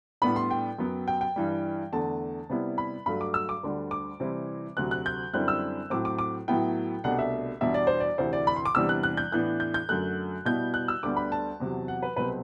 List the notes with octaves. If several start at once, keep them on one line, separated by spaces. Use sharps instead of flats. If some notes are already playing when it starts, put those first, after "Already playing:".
A2 G3 B3 D4 B5
C6
G5
F#2 F#3 B3
G5
G5
G2 E3 G3
E2 D3 A3 A5
C3 G3 B3 E4
B5
G2 F#3 A3 B5
D6
E6
D6
D2 D3 G3 D4
D6
C3 E3 G3 C4 E4
D2 C3 F#3 F#6
F#6
G6
F#2 D3 G3 C4 E4 F#6
E6
A2 F#3 C4 D6
D6
D6
A2 F#3 B3 E4 G5
C2 B2 A3 D4 F#5
E5
E2 B2 G3 D4 E5
D5
C5
D5
D2 C3 E3 C5
D5
B5
C6
D6
E2 C3 E3 G3 D4 E6
F#6
F#6
G6
A2 E3 B3 D4 F#6
G6
G6
F#2 D3 F#3 A3 F#6
B2 G3 B3 E4 G6
F#6
E6
D2 D3 G3 B3 D6
B5
A5
E2 C3 F#3
F#5
B4
C2 B2 F#3 C4 B4